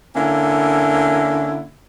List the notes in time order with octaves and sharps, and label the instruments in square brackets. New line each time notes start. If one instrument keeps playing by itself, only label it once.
[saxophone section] D3 A#3 C#4 E4